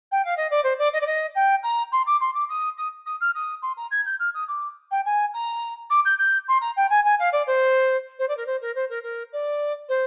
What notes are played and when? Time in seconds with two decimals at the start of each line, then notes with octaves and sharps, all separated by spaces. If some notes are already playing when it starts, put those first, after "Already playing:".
0.12 G5
0.25 F5
0.37 D#5
0.51 D5
0.64 C5
0.79 D5
0.93 D#5
1.01 D5
1.07 D#5
1.35 G5
1.63 A#5
1.92 C6
2.07 D6
2.21 C6
2.34 D6
2.49 D#6
2.78 D#6
3.06 D#6
3.21 F6
3.35 D#6
3.62 C6
3.77 A#5
3.91 G#6
4.06 G6
4.20 F6
4.35 D#6
4.48 D6
4.91 G5
5.06 G#5
5.34 A#5
5.90 D6
6.05 G6
6.19 G6
6.48 C6
6.61 A#5
6.77 G5
6.90 G#5
7.05 G#5
7.19 F5
7.33 D5
7.47 C5
8.19 C5
8.28 D5
8.37 A#4
8.46 C5
8.62 A#4
8.75 C5
8.90 A#4
9.03 A#4
9.33 D5
9.89 C5